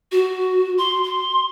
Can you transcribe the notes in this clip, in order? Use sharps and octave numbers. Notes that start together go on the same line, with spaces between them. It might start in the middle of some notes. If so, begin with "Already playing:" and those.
F#4
C6
C6